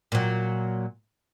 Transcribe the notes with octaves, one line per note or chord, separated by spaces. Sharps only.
A#2 F#3